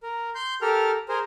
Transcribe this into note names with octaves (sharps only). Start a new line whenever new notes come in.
A#4
C6 G6
G4 A4 A#4 F6
G#4 A#4 C5